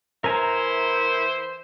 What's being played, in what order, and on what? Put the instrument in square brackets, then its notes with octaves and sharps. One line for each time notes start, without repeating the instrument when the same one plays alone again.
[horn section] E3 E4 C5 [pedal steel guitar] A#4 G#5 A#5